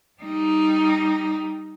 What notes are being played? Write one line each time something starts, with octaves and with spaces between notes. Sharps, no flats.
G3 D#4